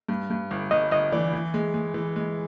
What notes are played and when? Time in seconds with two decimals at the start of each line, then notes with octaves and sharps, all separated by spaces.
0.09 G2
0.30 G2
0.51 G1
0.71 G1 D#5
0.91 G1 D#5
1.12 E3 D5
1.33 E3
1.54 G#3
1.74 G#3
1.94 E3
2.16 G#3